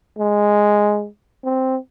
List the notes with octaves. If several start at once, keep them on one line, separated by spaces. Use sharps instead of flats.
G#3
C4